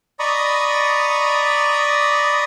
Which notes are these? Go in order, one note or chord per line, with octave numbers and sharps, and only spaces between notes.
D5 D#5 A#5 B5 C#6 D#6